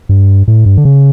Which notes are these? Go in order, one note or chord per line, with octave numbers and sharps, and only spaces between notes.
G2
A2
G2
D3
C#3